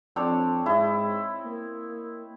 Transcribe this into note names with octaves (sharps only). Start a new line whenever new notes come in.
F2 C4 D4 C#5
G#2 E4 D#5
A#3